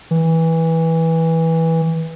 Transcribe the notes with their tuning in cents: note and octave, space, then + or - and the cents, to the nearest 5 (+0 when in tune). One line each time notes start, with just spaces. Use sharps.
E3 -15